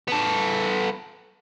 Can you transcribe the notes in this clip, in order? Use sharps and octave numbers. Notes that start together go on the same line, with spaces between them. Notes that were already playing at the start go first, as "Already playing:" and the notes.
B3 A4